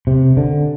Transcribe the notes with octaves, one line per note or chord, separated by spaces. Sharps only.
C3
D3